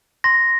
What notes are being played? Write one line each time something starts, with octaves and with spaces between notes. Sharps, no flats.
C6 A#6